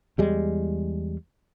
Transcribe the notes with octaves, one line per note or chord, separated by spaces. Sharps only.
E2 G3 G#3